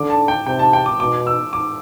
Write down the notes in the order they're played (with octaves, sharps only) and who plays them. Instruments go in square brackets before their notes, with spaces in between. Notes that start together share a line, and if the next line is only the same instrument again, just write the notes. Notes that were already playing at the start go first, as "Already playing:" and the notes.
Already playing: [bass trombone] D3 [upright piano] D6
[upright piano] A5
G5
[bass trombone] C3 [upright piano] G5
[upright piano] A5
G5
D6
[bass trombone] B2 [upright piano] D6
[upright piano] E6
D6